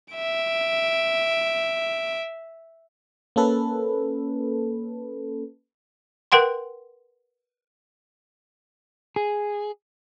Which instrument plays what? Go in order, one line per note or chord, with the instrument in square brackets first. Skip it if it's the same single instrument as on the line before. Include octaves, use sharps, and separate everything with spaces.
[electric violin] E5 D7
[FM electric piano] A#3 C#4 A4 B4
[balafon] A#4 B4 F#5 G5 C6
[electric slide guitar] G#4